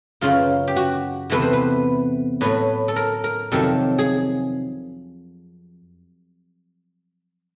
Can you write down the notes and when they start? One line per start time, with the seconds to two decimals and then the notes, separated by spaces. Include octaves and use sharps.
0.21 F#2 C#3 E3 F4
0.68 G4
0.76 F#4
1.30 E2 C3 E3 A3 B4
1.42 C5
1.53 B4
2.41 A2 F#3 A3 B4
2.88 A4
2.96 A#4
3.24 A#4
3.52 F2 C3 D#3 F#3 A4
3.99 G#4